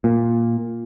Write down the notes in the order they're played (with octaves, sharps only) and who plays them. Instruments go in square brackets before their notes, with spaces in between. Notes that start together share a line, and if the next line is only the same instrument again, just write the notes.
[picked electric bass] A#2